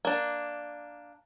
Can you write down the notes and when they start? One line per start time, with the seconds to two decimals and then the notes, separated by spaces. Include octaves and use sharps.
0.05 A#3 D4